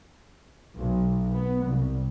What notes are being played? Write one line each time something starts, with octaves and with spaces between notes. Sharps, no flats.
B1
B3
C2